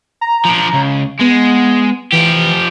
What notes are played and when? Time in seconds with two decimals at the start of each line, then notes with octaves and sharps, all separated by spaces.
0.21 A#5
0.45 F3 D4
0.74 C#2
1.20 G#3 B3
2.12 E3 F3 G4